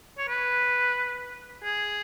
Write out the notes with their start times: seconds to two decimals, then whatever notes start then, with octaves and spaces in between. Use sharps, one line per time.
0.18 C#5
0.28 B4
1.64 G#4